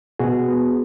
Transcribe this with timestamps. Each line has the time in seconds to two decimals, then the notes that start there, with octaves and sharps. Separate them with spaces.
0.19 B2 F#4 G#4
0.48 B3